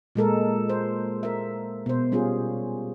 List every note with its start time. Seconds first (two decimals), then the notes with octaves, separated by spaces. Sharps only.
0.15 A#2 G#3 A4 A#4
0.69 C5
1.23 A#4 E5
1.86 B2 C5
2.12 G3 C#4 F4 G#4